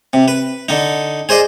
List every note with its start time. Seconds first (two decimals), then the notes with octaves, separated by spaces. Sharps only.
0.13 C3
0.28 B4
0.69 D3 D#4
1.29 G#4 C5 D5 D#5